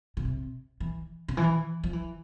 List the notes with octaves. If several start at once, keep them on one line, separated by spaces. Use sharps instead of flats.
C#3
C3
E3
C#3
E3
F3
E3